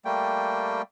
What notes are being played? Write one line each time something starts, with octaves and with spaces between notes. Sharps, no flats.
G3 A3 A#3 G5